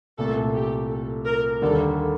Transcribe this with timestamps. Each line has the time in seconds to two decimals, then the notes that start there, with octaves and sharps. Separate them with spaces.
0.18 C2 A#2 A3 A4
0.54 G4
0.89 A4
1.25 A#4
1.62 D#2 D3 G3 A#3 A4